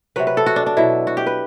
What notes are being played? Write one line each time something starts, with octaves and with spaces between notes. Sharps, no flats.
C3 F#3 B4
B4
A4
F#4
D4
D4
B2 F#3 E4
F#4
G4
B4